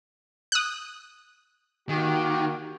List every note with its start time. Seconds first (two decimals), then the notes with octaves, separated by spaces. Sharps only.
0.52 D#6 F#6
1.89 D#3 A#3 F#4 G4